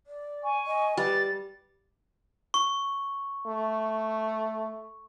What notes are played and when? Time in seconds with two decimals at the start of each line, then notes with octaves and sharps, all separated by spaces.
0.07 D5
0.44 G#5 C#6
0.67 D#5
0.97 G3 B4 A6
2.54 C#6
3.46 A3